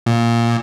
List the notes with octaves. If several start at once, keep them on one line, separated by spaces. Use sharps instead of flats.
A#2